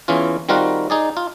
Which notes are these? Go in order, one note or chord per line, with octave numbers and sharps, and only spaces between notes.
E2 E3 C#4 F4
D#3 G3 C4 F4 F#4 A#4
D#4 G#4 D5
F4